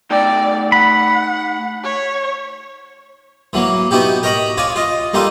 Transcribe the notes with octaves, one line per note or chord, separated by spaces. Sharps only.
A3 D#4 D5 G5
F#5 B5
C#5
E3 F#3 A#3
B3 D#4 E4 F#4 G4
A#4 C#5 D#5 A#5 B5
F4 C#5 D5 G#5
F4 D#5
G3 A#3 D#4 F4 A4